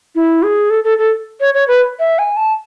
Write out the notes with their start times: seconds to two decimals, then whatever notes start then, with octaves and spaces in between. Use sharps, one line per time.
0.15 E4
0.43 G#4
0.70 A4
0.84 A4
0.98 A4
1.40 C#5
1.54 C#5
1.68 B4
2.00 E5
2.19 G#5
2.37 A5